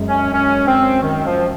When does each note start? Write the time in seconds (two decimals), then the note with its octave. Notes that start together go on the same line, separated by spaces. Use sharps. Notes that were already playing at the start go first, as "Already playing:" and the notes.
Already playing: F#2 G#3
0.08 C#4
0.33 C#4
0.67 C4
1.02 D#3
1.26 F3